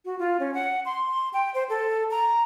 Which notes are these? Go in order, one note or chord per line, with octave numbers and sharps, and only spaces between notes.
F#4
F4
C#4
F#5
C6
G5
C5
A4
A#5